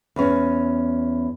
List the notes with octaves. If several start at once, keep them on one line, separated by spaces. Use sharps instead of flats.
E2 C#4